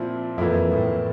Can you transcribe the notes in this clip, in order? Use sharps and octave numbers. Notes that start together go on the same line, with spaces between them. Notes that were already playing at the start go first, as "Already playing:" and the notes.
Already playing: A#2 F3 C4 E4
F2 E3 A#3 E4
A2